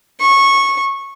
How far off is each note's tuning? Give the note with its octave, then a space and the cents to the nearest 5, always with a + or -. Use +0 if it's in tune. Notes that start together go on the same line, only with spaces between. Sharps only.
C#6 -15